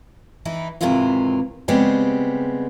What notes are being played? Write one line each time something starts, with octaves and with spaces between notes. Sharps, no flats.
E3 D#4 E4
G#2 C3 D#3 E3 E4 F4
C#3 G3 G#3 B3 C4 G4